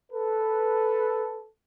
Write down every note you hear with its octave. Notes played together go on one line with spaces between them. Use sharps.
A4 B4